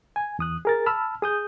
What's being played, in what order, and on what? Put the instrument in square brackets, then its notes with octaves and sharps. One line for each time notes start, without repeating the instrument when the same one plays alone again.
[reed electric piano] G#5
E2 D#6 F#6
G#4 A#4 A6
A5 B5 E6 F6
G#4 D#6 G6